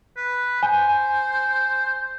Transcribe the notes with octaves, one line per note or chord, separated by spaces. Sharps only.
B4
C5 G#5